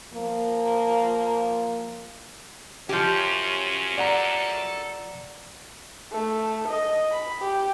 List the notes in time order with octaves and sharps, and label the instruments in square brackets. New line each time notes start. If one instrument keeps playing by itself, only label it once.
[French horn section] F3 A#3
[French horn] F#2 [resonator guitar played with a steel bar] F3 G4 [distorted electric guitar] C#4
[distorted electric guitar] A4 [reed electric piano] D5 F#5 A#5
[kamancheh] A3
D#5
B5
G4